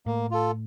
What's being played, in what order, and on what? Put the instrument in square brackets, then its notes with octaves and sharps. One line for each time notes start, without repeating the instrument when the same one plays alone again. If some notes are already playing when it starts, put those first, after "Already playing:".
[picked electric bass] A2 [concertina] A#3
[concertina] F4 A4